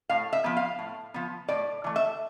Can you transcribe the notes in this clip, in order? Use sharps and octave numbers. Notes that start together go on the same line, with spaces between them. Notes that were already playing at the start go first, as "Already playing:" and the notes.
A2 F5
E5
F3 B3
F5
A2
F3 B3
A2 D5
E3 A3
E5